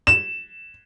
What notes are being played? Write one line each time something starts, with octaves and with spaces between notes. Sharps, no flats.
E7